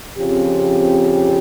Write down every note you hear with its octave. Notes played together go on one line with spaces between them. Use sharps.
F2 C#3 F3 C4 G4